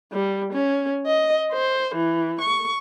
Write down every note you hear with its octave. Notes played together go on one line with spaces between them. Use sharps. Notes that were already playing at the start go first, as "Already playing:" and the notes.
G3
C#4
D#5
C5
E3
C#6